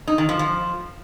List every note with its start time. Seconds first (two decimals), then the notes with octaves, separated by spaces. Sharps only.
0.07 D#4
0.18 D#3
0.29 F3
0.39 F3